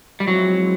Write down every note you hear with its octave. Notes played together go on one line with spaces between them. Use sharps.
G3
F3 F#3 G#3 C4 E4